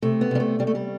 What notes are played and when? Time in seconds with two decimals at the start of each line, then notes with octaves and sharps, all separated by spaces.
0.02 C3 A3
0.21 B3
0.31 C3 G3
0.40 A3
0.59 C3 G3
0.67 A3
0.75 G3